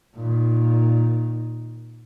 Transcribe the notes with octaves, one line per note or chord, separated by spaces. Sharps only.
A#2 D#3